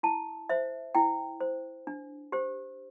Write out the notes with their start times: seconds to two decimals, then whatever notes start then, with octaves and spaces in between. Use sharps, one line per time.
0.03 E4 A5
0.49 C5 E5
0.95 E4 G5
1.41 C5
1.87 D4
2.32 G4 C5